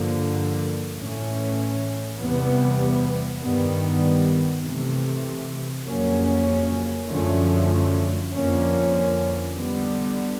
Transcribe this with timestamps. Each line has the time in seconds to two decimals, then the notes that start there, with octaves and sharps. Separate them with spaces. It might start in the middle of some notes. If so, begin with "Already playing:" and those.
Already playing: G2 D3 F3 A#3
0.95 A2 E3 A3 C#4
2.18 E2 C3 E3 G3 B3
3.40 G2 D#3 G3 B3
4.63 C3 E3 A3
5.86 F2 C#3 F#3 A#3 C#4
7.08 F#2 D3 F3 A3 C#4
8.31 F2 D3 F3 A#3 C#4
9.55 D3 G3 B3